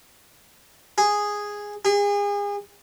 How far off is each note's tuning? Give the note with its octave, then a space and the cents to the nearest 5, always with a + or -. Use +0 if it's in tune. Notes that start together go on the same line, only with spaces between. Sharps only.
G#4 -5
G#4 -35